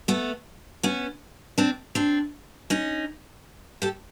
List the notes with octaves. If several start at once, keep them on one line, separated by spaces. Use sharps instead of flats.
A3 B3
B3 C#4
C4 D4
C4 D4
C#4 D#4
G4 A4